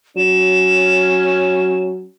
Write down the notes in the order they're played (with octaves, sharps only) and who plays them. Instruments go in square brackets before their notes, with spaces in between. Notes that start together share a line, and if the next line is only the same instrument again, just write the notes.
[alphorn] F#3 [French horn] C#4 [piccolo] E7